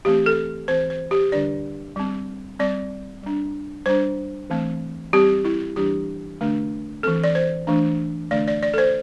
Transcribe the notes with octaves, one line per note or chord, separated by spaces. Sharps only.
E3 A3 C4 G4
A4
E3 C4 C5
C5
G4
D3 G3 D4 D5
G3 C4
G3 C4 D5
G3 D4
G3 D4 C5
E3 A3 C4
G3 C4 G4
E4
E3 G3 D4 G4
D3 A3 D4
E3 C4 A4
D5
C5
E3 A3 D4
D3 A3 D4 D5
D5
D5
A4
C5